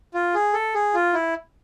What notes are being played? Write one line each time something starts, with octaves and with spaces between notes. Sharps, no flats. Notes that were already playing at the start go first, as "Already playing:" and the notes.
F4
G#4
A4
G#4
F4
E4